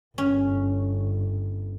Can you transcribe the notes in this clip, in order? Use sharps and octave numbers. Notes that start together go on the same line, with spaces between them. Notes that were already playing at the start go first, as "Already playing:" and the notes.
G1 C#4